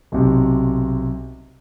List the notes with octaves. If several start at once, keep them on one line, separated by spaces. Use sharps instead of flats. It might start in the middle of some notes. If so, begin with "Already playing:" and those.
B1 C3